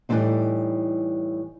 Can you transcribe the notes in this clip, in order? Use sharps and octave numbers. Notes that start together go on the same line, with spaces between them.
A2 E3 F#3 G3 C4 D#4